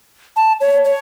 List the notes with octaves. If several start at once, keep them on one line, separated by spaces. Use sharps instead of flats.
A5
C#5
C#5